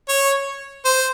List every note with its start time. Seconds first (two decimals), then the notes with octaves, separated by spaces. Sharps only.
0.09 C#5
0.85 C5